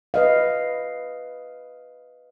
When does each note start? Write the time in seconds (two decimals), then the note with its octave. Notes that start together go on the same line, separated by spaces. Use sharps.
0.14 B4 D#5 F5